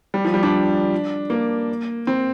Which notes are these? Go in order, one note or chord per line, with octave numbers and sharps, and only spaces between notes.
G3
F3
G3
D4
A#3
C4